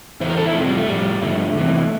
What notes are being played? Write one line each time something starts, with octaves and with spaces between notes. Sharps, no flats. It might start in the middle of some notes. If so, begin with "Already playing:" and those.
E2 E3 C5
A#4
A4
E4
F2 C3 F3 A3
G3
A3
A2 F3 G3
G2 D3 F3 A3
E2 C3 E3